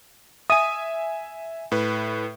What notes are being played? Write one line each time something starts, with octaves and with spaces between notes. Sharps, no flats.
E5 G#5 D#6
A2 B4